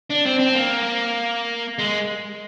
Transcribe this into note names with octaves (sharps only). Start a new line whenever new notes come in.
D4
C4
C4
A#3
G#3